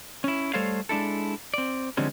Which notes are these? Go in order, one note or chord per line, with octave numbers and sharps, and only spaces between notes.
C#4 E4
G3 A3 A4 C5 C#5 F5
G#3 D4 E4 A4
C4 D5
D3 F3 G3 G#3 C4 C#4